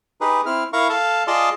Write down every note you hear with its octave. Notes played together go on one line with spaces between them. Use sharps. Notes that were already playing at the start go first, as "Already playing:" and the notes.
D#4 G4 G#4 B4
C4 E4 F6
E4 A#4 F5 A#5 C#6
A4 F5 A5
F4 G#4 D5 D#5 A5 C6